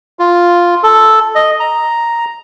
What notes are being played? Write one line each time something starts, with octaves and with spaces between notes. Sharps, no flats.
F4
A4
D#5
A#5